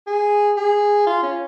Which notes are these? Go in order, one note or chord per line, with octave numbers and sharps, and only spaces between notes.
G#4
G#4
F4
C#4